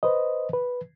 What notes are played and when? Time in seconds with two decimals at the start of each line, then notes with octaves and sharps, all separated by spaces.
0.03 B4 C5 D#5
0.53 B4